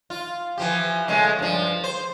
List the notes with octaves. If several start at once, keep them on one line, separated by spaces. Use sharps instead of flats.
F4
E3 F3 G4
C#3 G#3 A3
G2 F3
C5